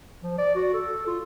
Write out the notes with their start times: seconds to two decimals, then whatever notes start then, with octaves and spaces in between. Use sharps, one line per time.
0.22 F3
0.38 D5
0.55 F#4
0.73 A4
1.06 F4